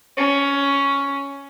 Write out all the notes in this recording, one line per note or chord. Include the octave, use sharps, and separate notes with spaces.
C#4